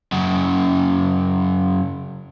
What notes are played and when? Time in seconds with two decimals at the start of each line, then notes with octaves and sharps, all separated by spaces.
0.12 F#2 C#3